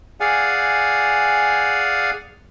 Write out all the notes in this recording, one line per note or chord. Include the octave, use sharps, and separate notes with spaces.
G#4 D5 F5 F#5 G#5